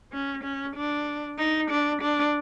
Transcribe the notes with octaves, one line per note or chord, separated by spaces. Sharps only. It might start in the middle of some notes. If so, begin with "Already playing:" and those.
C#4
C#4
D4
D#4
D4
D4